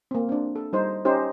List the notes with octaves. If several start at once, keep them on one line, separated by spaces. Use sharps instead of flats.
A#3 C4
C4 D4
A4
G3 D#4 C5
C#4 D#4 G4 C5